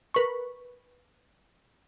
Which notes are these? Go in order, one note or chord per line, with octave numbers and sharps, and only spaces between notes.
A#4 B4 C#6